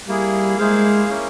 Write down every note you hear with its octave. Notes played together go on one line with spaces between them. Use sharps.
G3 A#3 E4 G#4
G#3 A#3 E4 G#4 C5 F5
A#3 C#4 E4